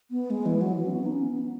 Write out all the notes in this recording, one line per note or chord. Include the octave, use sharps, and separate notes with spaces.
B3
G#3
E3
F#3
E3
C#4
B3
D#4
C#4
B3